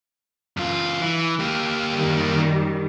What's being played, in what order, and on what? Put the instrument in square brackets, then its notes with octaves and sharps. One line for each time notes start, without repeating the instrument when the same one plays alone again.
[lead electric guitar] F#2 F4
E3
A#3 G4
[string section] F#2 D#3 G3